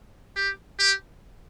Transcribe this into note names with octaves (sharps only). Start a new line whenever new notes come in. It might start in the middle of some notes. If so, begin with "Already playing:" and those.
G4
G4